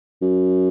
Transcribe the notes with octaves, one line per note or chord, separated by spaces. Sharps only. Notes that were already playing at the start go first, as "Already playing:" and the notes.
F#2